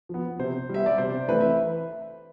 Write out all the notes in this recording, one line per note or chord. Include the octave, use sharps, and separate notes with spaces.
F3 B3
C3 C5
G3 B3 E5
D5
C3 C5
E3 A3 C4 B4
E5